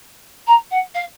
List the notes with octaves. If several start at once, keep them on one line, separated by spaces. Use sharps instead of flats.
A#5
F#5
F5